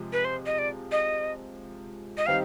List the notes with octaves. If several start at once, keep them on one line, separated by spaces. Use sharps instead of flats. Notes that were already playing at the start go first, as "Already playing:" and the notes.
Already playing: C3 F3 G#3
B4
C5
D#5
D5
D#5
D#5
D#3 G3 C4 D#4 F5